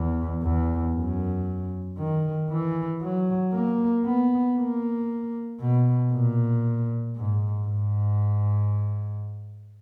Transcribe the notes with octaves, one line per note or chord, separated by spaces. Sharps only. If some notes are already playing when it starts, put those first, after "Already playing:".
Already playing: E2
E2
F#2
D#3
E3
F#3
A#3
B3
A#3
B2
A#2
G#2
G#2